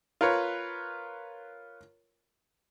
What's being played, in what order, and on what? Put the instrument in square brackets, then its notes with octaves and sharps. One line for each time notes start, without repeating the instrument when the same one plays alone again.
[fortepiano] F4 A#4 B4 C#5